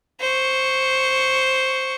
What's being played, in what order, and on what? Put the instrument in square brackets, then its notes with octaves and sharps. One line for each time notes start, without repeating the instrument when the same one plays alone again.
[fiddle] C5 C#6